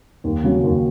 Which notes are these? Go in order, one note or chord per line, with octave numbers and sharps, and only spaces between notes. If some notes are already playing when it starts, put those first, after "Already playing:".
D#2
C#3 F#3
D#2